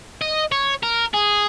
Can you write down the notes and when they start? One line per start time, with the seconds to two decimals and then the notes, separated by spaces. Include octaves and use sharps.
0.21 D#5
0.52 C#5
0.83 A#4
1.14 G#4